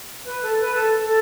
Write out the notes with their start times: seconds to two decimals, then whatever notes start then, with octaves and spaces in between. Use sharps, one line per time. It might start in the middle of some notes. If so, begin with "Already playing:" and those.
0.25 B4
0.43 A4
0.61 B4
0.75 A4
1.01 A4